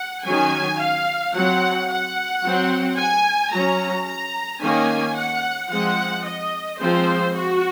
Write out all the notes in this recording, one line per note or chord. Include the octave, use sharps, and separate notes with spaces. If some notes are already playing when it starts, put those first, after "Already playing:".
Already playing: F#5
D#3 F#3 C#4 G#5
F5
F#3 C4 F#5
F#5
F#3 C4
G#5
F#3 C#4 A#5
A#5
D#3 A#3 C#4 G#5
F#5
F3 G#3 C4 F#5
D#5
F3 G#3 C4 C5
F#4